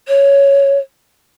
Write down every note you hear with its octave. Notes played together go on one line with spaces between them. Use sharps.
C#5